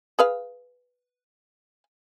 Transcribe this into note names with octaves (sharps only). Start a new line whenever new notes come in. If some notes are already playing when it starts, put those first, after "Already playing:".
G#4 B4 F5